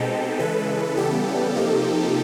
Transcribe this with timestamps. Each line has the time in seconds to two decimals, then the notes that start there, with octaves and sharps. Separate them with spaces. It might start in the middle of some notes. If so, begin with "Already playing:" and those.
Already playing: B2 G#3 C4 D#4 G4 A4
0.39 C#3 E3 G#3 A4 B4
0.97 C#3 E3 G3 B3 G4 A4
1.56 C3 F3 A#3 D#4